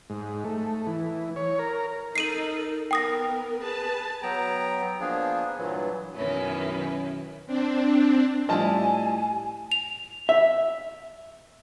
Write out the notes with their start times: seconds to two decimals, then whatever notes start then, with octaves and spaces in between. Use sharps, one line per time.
0.10 G#2
0.45 A3
0.87 E3
1.36 C#5
1.59 A#4
2.16 D#4 A4 A#4 C7 D#7 F#7
2.91 B3 A#4 G5 D#6 A#6
3.62 G#4 B4 A5
4.23 F#3 B3 G5 A#5
5.00 F3 A#3 B3 D4 G#4
5.58 G2 A#2 E3 F#3
6.14 F#2 B2 D#3 C#4 E4 B4
7.46 C4 D4
8.49 A2 F3 G3 E4 D#5 G#5 A5
9.72 F7
10.29 E5